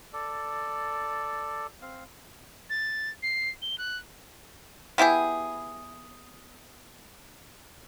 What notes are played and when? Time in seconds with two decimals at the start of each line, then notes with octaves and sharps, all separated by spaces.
0.13 A4 D5
1.82 C4 F5
2.70 A6
3.23 C7
3.62 G7
3.78 F#6
4.98 B3 E4 G4 G#4